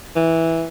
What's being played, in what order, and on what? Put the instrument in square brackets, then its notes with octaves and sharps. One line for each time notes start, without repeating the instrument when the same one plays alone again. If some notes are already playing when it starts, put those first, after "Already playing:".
[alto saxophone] E3